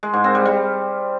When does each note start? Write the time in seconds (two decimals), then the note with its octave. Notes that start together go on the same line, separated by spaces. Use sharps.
0.03 G#3
0.14 G#2
0.24 C4
0.35 G3
0.45 G3